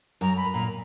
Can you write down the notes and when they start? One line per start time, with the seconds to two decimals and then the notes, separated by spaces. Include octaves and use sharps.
0.21 F#2 A#5
0.37 B5
0.53 A#2 A#5